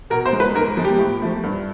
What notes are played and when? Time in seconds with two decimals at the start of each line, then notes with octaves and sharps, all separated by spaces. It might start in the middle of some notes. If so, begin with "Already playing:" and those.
0.10 B2 A#4
0.25 C5
0.33 G#3
0.40 B4
0.55 G#2 A#4
0.77 F3 G#3
0.85 G4
0.99 A2
1.22 F3 A3
1.43 G2